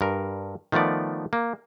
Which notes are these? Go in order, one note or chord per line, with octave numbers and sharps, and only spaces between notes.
G2 A#4
D#3 F3 A3 B3 D5
A#3